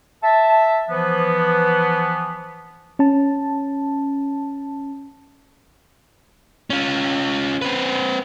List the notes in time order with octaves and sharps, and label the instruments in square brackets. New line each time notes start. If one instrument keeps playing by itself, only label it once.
[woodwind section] E5 A5
E3 F3 B3
[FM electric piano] C#4 A5
[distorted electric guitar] C#4 F4
C4 B4